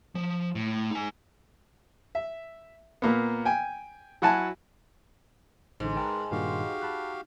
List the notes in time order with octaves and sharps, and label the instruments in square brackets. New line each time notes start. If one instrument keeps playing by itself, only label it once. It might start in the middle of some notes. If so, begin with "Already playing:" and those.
[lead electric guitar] F3
A2
D#4 G#5
[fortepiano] E5
A#2 A#3 B3
G5 G#5
F#3 E4 F#4 F#5 G#5 A5
[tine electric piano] A1 D3 [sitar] G#2
[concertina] G#3 A#4 B4 [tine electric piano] G5 A5 A#5
[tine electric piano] G2 A#2 D#3 [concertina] F#4 G4 F5
[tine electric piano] A5 B5 F#6